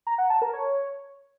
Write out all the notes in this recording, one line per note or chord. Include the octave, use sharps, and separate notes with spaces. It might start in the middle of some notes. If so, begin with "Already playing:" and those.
A#5
F#5
A5
A#4
C#5